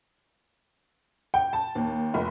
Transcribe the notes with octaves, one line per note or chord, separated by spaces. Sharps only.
G5
A5
D#2
F1